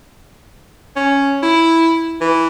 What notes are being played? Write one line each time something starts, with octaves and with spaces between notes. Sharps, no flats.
C#4
E4
E3